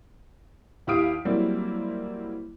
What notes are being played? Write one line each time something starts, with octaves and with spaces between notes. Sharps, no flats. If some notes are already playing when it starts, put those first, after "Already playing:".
D#2 E4 G4 F5 D#6 D7
F#3 G3 A#3 C4 E4